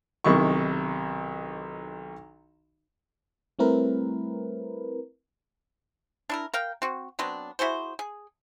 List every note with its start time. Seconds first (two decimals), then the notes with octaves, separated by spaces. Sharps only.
0.24 B1 C3 D#3 E4 C#6
3.59 G3 A3 C4 E4 A#4 B4
6.29 D4 E4 A#4
6.54 A#4 F5 G5
6.82 C4 F#4
7.19 F#3 B3 C4 D4
7.59 E4 F#4 G#4 C5
7.99 G#4